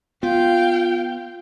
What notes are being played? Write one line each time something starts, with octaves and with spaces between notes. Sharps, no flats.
B3 F4 F5 G5